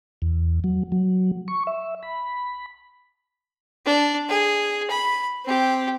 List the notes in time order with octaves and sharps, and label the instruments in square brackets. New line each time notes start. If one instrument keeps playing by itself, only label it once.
[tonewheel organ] E2
F#3
F#3
C#6
E5
B5
[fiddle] D4
G#4
B5
C4 G4